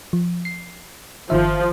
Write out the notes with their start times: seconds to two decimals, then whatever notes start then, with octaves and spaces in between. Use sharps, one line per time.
0.13 F3
0.45 C7
1.30 G1 D#3 F3 E5